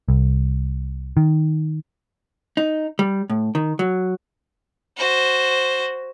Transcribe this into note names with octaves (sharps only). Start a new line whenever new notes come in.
C2
D#3
D#4
G3
A2
D#3
F#3
F#4 C5